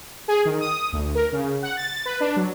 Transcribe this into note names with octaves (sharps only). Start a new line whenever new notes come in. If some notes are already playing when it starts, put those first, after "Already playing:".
G#4
D#3
D#6
D2
A#4
C#3
F#5
A6
B4
D4
F#3